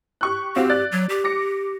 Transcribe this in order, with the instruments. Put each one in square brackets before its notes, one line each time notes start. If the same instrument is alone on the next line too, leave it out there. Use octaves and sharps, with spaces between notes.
[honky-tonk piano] G4 C#6 F#6
[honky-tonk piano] C4 F#4 F5 [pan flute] G4
[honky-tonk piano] D5 F#6 A6
[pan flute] F#3
G4
[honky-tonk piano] D6 A#6 C#7